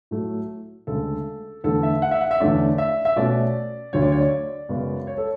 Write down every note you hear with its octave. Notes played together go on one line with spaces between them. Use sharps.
A2 F#3 A3
D2 C#3 G#3 A4
E2 D3 A3 A4
E5
F#5
E5
F#5
E5
E2 D3 A3 C#4 D5
E5
E5
B2 A3 C#4 D5
D2 D3 F#3 C#5
D5
C#5
D5
F#2 C#3 G#3 B3
C#5
A4